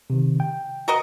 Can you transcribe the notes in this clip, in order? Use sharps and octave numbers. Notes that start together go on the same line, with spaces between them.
C3 D#3
G5
F#4 A#4 D#5